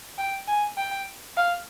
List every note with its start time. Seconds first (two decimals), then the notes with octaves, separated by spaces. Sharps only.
0.18 G5
0.48 G#5
0.77 G5
1.37 F5